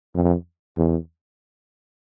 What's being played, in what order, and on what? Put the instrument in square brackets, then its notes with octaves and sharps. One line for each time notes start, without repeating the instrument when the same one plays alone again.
[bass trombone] F2
E2